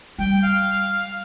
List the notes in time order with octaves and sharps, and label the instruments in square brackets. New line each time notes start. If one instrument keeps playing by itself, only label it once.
[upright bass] G3 [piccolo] G5
[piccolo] F5